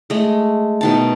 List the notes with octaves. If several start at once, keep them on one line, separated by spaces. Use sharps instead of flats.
G#3 A3
B2 D#3 A5